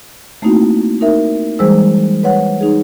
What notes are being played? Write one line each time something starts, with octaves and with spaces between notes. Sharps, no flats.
A3 A#3 C4 D#4 E4 F#4
D#4 A#4 E5
E3 G3 G#3 G#4 C5 E6
B4 C#5 F#5
D#4 G#4